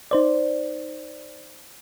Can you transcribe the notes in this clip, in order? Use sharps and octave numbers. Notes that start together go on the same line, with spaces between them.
D#4 C5 D5